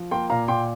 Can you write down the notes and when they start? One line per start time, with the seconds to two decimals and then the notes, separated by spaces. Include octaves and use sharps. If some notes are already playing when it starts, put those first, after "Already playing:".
Already playing: F3
0.11 A#3 G5 C6
0.30 A#2 F5 A#5
0.48 A#2 G5 C6